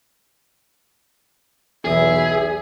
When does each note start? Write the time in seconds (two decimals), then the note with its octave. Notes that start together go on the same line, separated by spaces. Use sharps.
1.85 B1 E2 G#4 E5